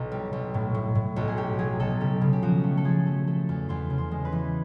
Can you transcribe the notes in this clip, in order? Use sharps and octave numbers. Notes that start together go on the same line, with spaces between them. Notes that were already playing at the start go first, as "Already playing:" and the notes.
Already playing: B1 B2 E4
G3
B1
A2
A2
A2
B1 F#4
G#4
A2 G4
F#3 G#4
B1 A4
C#3 G4
C#3
G4
F3 F#4
A3
A4
F3 G#4
A3
A3 A4
E2
E2 C5
C#3
C5
G#3
B4
E3